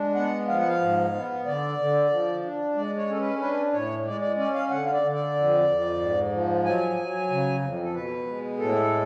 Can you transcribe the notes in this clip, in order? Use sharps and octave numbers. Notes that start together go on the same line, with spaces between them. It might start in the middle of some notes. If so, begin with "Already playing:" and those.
Already playing: G#3 D4
B3 F#5
F3 F5
F#5
F5
G#2
B3
D3 D5
D3
F3
D4
G#3 D5
C#5
C#4 A4
B4
D4 B4
A2 C#5
G#3 D5
D5
C#4 D5
F5
D3 F#5
F5
D5
D3
D5
F2
F2
G#2
F3
F#3 G#5
F#3
C#3
F2
A4
B2 B4
G#3
A2 A4